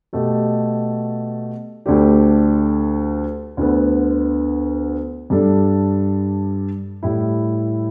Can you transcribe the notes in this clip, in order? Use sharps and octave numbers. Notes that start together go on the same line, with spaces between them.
B2 A3 G4
D2 D3 A3 D4 G4
D2 D3 B3
G2 G3 D4 A4
A2 G3 E4